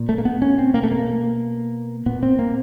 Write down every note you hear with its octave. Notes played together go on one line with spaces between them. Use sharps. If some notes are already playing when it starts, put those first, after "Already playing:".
Already playing: A#2
A3
A#3
B3
C#4
C4
B2 A#3
A3
A#3
A#2 B3
C4
A#3